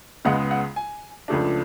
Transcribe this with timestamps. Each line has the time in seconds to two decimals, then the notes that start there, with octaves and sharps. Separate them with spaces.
0.25 C#2 C#3 G#3 B3 F#5
0.51 F#5
0.76 G#5
1.28 C#2 C#3 F3 A3 D4